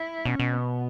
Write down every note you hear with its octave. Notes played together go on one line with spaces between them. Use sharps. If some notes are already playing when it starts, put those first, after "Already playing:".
Already playing: E4
B2 C#4
B2
B3